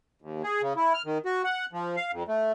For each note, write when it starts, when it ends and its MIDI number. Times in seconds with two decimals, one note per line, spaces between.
0.22 0.42 39
0.44 0.62 68
0.62 0.73 49
0.76 0.93 64
0.94 1.02 89
1.06 1.18 51
1.25 1.42 66
1.44 1.66 78
1.73 1.96 53
1.96 2.11 77
2.12 2.23 41
2.28 2.52 57